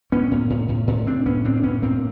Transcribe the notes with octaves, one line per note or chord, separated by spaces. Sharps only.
A2 B3 C#4
A2
A2
A2
A2
A2 C4 D4
A2 B3 C#4
A2 C4 D4
D4
A2 B3 C#4
A2 A#3 C4